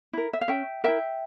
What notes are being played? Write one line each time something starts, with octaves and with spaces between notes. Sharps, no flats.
E4 A#4
E5
F5
C#4 E5 G5
E4 A#4 E5 G5